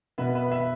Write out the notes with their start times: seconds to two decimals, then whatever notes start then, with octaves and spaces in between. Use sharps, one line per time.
0.18 B2 B3 B4 E5
0.35 B4 E5
0.51 B4 E5